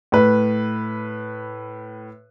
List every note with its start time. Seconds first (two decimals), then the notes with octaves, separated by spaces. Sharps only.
0.12 A2 B4